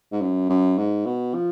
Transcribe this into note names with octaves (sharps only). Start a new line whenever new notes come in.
G#2
F#2
F#2
G#2
B2
F3